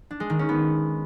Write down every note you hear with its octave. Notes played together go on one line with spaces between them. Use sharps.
D4
G#3
D#3
C#4
B3